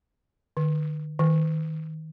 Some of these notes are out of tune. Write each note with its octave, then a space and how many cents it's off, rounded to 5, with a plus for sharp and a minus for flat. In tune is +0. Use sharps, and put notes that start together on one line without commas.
D#3 -40
D#3 +20